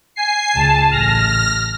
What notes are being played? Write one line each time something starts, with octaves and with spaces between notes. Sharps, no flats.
G#5 C7
C#2 A5
A1 F6 A#6